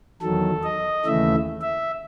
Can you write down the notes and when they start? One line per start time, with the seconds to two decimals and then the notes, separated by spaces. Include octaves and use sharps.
0.21 E2 D#3 F#3 A4
0.63 D#5
1.05 D#2 C#3 E3 A3 E5
1.61 E5